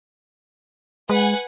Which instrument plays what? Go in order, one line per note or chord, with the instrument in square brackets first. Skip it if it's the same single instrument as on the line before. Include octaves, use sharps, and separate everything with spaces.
[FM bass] G#3 [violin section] B4 F#5 G#5